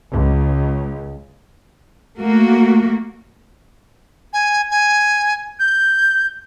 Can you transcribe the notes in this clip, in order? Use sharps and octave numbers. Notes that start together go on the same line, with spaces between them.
C#2
A3 A#3 F#4
G#5
G#5
G6